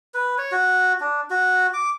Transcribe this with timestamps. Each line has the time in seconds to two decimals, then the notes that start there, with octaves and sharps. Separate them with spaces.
0.14 B4
0.38 C#5
0.52 F#4
1.00 D4
1.30 F#4
1.73 D6